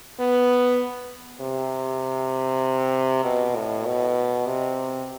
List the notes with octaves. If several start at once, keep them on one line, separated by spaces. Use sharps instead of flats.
B3
C3
B2
A2
B2
C3